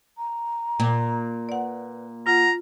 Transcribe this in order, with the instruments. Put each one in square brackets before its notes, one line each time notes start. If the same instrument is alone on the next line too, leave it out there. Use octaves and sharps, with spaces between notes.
[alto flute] A#5
[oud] A#2
[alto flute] B4 [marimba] D5 F#5
[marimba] F4 [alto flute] F#5 [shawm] A#5